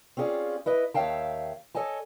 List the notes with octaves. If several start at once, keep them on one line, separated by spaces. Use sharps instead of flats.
C4 C#4 F4 G#4 D5
E4 B4 D#5
D#2 C#5 E5 F5 G5 A5
A4 C#5 D#5 G#5 A5